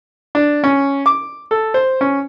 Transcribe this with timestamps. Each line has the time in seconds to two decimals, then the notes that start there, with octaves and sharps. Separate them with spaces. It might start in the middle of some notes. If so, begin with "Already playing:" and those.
0.35 D4
0.64 C#4
1.06 D6
1.51 A4
1.74 C5
2.01 C#4